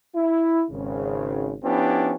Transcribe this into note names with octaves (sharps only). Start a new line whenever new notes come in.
E4
G#1 C#3
F3 B3 C#4 D4 E4 G4